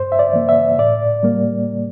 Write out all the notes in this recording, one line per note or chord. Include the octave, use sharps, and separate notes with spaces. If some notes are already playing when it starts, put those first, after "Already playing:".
Already playing: G2 C5
E5
D5
E3 A#3
E5
A2 D5
G3 A#3